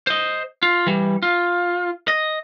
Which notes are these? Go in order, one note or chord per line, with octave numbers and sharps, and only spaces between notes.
C5 D#5
F4
E3 G3
F4
D#5